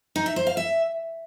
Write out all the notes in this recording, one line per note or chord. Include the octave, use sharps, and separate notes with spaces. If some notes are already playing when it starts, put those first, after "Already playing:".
D#4
E5
C5
F5
E5